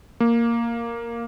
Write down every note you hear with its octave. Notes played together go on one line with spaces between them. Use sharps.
A#3